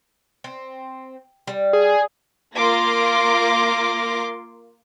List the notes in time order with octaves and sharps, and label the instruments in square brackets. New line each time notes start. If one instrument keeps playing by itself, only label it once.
[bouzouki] C4
G3
[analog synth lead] G#4
[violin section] A#3 F4 A#4 C6 D6 A#6